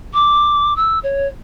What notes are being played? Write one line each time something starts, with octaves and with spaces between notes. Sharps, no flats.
D6
E6
C#5